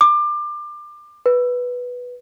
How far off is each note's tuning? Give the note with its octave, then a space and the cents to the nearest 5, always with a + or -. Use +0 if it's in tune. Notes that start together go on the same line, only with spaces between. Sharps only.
D6 +25
B4 -5